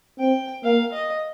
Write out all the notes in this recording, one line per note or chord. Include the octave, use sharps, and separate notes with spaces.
C4 G5
A#3 F5
D#5